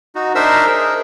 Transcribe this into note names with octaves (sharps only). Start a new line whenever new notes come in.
D#4 F#4
D4 D#4 A#4 C5 E5 E6
G#4 A#4